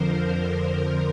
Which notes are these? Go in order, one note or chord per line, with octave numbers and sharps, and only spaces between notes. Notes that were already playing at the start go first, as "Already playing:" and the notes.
Already playing: F2 D3 F3 A#4 C5
A#4
A#4